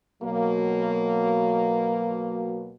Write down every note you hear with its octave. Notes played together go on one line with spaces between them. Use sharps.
B2 F#3 A#3